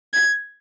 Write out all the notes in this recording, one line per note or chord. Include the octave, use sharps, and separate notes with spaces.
G#6